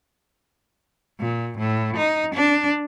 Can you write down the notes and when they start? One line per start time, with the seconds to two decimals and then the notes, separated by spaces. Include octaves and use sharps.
1.19 A#2
1.58 A2
1.97 D#4
2.35 D4